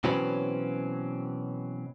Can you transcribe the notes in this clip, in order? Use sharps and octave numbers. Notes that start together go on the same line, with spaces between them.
B2 E3 F#3 C4 C#4 B4